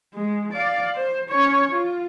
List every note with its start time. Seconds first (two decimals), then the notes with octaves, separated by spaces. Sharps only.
0.14 G#3
0.52 D5 F5
0.95 C5
1.29 C#4 C#5
1.71 F4